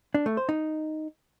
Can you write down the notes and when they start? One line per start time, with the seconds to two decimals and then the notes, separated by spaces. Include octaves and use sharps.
0.14 D4
0.26 A3
0.37 C5
0.49 D#4